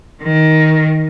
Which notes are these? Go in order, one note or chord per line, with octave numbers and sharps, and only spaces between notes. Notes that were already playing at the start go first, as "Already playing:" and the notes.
D#3